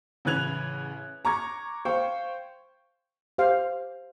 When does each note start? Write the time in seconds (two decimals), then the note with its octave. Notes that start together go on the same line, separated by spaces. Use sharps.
0.25 A1 C#3 B4 F#6 G#6 F7
1.25 A#5 C#6 D6 G#6
1.85 C5 F5 G5 C#6
3.38 G4 C5 F5